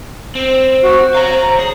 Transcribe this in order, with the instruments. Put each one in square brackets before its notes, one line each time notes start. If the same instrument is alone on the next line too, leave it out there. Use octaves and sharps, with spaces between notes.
[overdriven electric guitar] C4 [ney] C5
[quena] F#4
[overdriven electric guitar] C#5 F5 [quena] A#5
[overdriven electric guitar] G#4